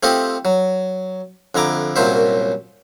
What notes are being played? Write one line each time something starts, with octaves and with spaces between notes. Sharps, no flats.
A3 C4 F4 G4 A4 D#5
F#3
F2 D3 E4 A#5 D6
C2 F#2 A#2 F#3 C5 E5